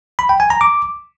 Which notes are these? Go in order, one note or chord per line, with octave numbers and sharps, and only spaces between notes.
B5
G5
G#5
A#5
D6